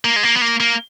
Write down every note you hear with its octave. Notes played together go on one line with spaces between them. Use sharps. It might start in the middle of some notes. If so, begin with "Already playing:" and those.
A#3
G#3
A#3
B3
A#3
A#3